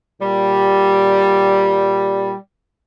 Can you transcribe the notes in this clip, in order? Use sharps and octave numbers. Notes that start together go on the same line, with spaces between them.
A#2 G3